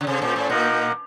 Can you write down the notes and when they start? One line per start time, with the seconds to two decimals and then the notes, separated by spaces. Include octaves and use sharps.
0.01 C#3
0.07 C3 C#4 A4 C5
0.22 A#2
0.36 A2
0.50 A#2 A#3 D#4 A#4 D#5 F#5